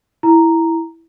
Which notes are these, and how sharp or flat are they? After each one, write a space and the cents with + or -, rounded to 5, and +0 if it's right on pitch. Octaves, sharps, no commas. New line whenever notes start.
E4 +0 A#5 +0